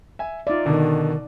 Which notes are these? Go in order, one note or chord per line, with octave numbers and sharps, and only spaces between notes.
E5 G#5
D#4 F4 D5 E5
B2 D3 D#3